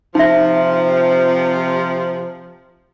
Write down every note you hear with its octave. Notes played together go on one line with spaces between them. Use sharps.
C3 F3 D#4 E5